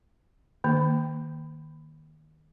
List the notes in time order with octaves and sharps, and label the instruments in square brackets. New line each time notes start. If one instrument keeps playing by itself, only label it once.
[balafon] D#3 A#3